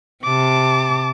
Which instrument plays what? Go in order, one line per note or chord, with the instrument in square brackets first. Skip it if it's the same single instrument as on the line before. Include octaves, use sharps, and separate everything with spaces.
[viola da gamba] C3 [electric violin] A5 D6